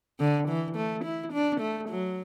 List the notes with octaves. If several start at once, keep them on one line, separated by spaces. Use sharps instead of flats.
D3
E3
A3
E4
D4
A3
F#3